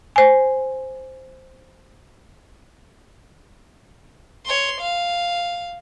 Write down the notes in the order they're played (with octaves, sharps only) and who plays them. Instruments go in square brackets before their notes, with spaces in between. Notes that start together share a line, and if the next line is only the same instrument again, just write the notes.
[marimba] C5 G#5
[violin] C#5 C6
F5